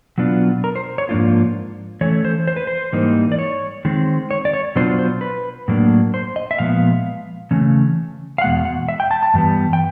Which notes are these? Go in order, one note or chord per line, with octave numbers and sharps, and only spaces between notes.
B2 F#3 B3 D4 F4
A#4
C5
C#5
G#2 F3 A#3 D4 F4
E3 A3 C#4 C#5
C5
C5
B4
C5
G#2 E3 G3 A#3 D#4
D5
C#5
D#3 G#3 C4
C#5
D5
C#5
B2 F#3 B3 D4 F4 C5
C5
B4
A2 F#3 A#3 D4
C5
D#5
E5
A#2 F3 G#3 B3 F5
C#3 E3 A3 C#4
F5
E2 B2 G#3 F#5
F#5
E5
G5
A5
A5
G2 E3 G3 B3
G5